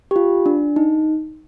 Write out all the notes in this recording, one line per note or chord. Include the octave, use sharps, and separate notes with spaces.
G4
F4
D4
D#4